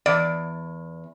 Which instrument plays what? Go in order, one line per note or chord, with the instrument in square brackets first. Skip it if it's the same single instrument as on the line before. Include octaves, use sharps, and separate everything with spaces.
[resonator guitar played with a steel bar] E2 [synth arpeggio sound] D5